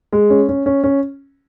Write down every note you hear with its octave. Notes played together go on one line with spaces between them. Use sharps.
G#3
C#4
C#4
C#4
C#4